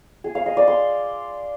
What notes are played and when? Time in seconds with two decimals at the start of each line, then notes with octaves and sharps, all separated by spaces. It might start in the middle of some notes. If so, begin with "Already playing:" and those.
0.24 G#4
0.35 F5
0.46 D#5
0.57 D5
0.68 C6